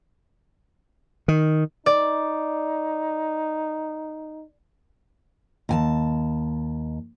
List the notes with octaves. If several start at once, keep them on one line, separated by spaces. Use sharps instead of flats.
D#3
D#4 D5
D#2 G#5 A5